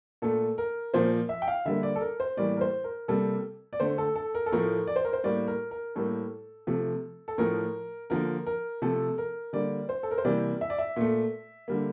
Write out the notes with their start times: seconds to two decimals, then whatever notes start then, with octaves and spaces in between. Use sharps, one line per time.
0.22 A#2 A3 A4
0.58 A#4
0.94 A#2 F3 A#3 C5
1.29 E5
1.42 G5
1.48 F5
1.65 D3 G3 A#3 E5
1.83 D5
1.96 A4
2.01 A#4
2.20 C5
2.37 A2 E3 G3 A#3 D5
2.57 A#4
2.61 C5
2.84 A#4
3.08 C3 G3 A#3 A4
3.73 D5
3.80 D3 A3 C5
3.98 A4
4.15 A4
4.35 A#4
4.46 A4
4.52 A2 F3 A3 A#4
4.87 D5
4.96 C5
5.05 A#4
5.13 C5
5.24 A2 G3 A#3 D5
5.48 A#4
5.71 A#4
5.95 A2 G3 A#3 A4
6.67 C3 F3 A3
7.28 A4
7.38 A2 F3 A3 A#4
8.10 D3 F3 A#3 A#4
8.46 A#4
8.82 C3 F3 A3 A4
9.18 A#4
9.53 D3 G3 A#3 D5
9.89 C5
10.03 A4
10.11 A#4
10.18 C5
10.25 C3 E3 G3 A#3 D5
10.61 E5
10.70 D5
10.78 E5
10.96 A#2 A3
11.68 D3 G3 A#3